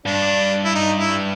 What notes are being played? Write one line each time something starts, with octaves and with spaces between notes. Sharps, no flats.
G2 D4
E4
D#4
E4